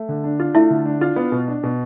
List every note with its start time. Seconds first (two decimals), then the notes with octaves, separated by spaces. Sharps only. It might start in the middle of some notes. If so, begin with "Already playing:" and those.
Already playing: A3
0.09 D3
0.24 D4
0.40 F4
0.55 A3 E4 E5
0.71 D3
0.86 D4
1.01 F4
1.16 B3
1.32 B2
1.48 D4
1.63 B2